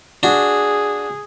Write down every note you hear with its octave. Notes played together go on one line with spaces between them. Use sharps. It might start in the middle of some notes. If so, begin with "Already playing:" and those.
D4 F#4 G#4